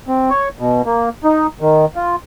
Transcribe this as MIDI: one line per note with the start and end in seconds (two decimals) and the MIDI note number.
0.08 0.30 60
0.30 0.49 73
0.59 0.82 47
0.86 1.09 58
1.24 1.47 63
1.61 1.85 51
1.96 2.16 65